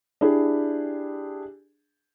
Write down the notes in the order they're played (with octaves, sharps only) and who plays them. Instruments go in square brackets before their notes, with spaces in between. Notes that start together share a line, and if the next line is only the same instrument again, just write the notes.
[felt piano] D4 E4 G4 G#4